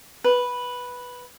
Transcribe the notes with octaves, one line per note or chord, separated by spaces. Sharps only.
B4